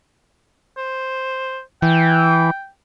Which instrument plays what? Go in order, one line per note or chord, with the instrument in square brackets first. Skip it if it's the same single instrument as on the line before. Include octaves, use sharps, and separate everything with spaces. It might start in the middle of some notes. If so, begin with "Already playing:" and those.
[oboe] C5
[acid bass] E3 [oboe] G5